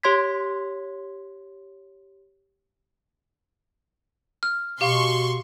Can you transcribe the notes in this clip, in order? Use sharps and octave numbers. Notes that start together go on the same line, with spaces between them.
G4 C#5 C6 G#6 B6
F6
B2 G4 F5 C6 C#6